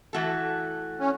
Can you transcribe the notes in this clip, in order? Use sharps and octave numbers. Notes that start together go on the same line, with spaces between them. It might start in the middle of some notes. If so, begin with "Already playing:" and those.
E3 A3 F#4 A4
C#4